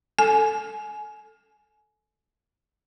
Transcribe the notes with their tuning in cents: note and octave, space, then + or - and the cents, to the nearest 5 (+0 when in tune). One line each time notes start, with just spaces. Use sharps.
A4 +0 G#5 +25